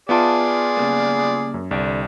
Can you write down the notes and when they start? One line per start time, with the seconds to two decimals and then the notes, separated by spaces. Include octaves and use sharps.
0.09 B3 F4 G#4 D5 E5 G5 A5
0.77 C#3 G3 A#3
1.54 F#2
1.71 C2 D3 D5 G5